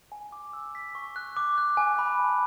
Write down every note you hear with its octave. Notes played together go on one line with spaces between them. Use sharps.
G#5
D6
E6
B6
C#6
F#6
D6
F#6
G#5
B5
A5